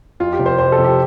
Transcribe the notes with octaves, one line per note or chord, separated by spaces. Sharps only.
F2 F4
G4
C3 F3
C5
F2 C5
A4
C3 F3
G4